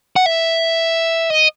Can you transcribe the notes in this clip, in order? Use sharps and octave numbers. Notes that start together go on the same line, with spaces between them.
F#5
E5
D#5